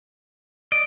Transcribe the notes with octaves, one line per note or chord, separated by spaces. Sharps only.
D5 D#5 D7